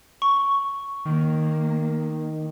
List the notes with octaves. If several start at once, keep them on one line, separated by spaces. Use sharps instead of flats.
C#6
D#3 A#3